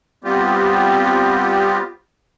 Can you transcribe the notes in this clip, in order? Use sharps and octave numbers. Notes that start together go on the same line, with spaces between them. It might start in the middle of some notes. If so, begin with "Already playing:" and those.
G3 B3 C4 F4 G4